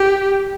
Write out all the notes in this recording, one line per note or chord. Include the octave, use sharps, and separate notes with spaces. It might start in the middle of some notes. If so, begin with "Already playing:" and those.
Already playing: G4